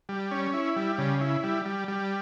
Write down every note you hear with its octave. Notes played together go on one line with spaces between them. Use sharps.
G3
C#4
E4
G3
C#3
E4
G3
G3
G3